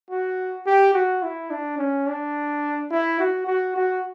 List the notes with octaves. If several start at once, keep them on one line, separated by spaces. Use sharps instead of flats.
F#4
G4
F#4
E4
D4
C#4
D4
E4
F#4
F#4
F#4